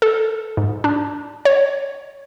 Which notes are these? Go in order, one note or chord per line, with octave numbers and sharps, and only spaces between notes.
A4
G#2
D4
C#5